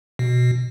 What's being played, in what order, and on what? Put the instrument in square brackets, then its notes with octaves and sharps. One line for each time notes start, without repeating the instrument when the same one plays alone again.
[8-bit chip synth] B2